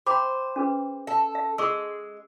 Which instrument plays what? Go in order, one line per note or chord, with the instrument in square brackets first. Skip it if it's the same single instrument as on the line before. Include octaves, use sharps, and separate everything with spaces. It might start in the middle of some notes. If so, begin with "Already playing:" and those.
[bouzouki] C5 [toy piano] G5 B5 D6
[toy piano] C#4 G#4 B4
[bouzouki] A4 [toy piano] E5
[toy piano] E5
[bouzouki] G#3 [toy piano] G#4 C#6 E6